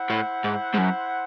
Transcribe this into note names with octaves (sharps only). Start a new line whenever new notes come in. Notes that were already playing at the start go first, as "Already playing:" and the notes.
Already playing: E4 C5 F#5
A2
G#2
G#2
F#2